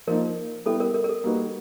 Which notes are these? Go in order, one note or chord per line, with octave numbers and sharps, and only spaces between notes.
F3 A#3 D#4 A#4
G3 B3 E4 G4 A4
A#4
A#4
A#4
A4
G3 A#3 D#4 F#4 B4